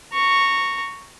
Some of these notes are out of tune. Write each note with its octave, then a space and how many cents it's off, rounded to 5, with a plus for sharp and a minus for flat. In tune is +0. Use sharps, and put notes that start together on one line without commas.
A#5 -15 C#6 +0